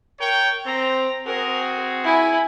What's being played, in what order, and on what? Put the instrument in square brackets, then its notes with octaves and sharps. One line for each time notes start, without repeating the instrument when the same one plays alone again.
[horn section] A#4 C#5 G5
[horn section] C4 [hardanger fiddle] A#5
[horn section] C4 F#4 G#4 [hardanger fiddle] A#4
[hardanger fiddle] E4 G#5